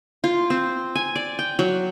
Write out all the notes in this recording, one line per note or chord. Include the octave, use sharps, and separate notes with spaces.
F4
C4
G#5
D5
G5
F#3